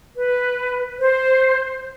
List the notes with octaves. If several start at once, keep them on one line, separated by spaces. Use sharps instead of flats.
B4
C5